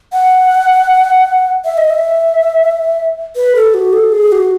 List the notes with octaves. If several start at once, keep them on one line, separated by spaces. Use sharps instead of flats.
F#5
E5
D#5
E5
B4
A4
F#4
A4
G#4
F#4